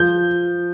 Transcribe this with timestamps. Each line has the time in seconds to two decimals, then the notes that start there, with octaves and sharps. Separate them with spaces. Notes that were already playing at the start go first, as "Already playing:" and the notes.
Already playing: F3 G6